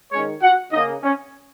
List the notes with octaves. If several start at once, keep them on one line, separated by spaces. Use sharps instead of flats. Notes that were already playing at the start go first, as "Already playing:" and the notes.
D#3 G#3 C#4 C#5
F#4 F#5
C#3 A#3 D#4 D#5
C#4